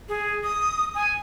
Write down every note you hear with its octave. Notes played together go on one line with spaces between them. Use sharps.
G#4
D#6
G#5